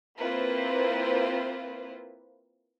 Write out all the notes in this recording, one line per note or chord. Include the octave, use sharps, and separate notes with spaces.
A#3 C4 E4 F4 B4 C5